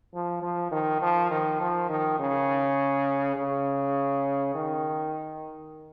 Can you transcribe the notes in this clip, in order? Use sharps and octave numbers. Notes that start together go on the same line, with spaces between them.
F3
F3
D#3
F3
D#3
F3
D#3
C#3
C#3
D#3